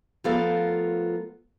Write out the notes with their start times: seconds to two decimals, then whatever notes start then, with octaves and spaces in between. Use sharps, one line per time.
0.24 F3 A3 B3 F4 A4 A#4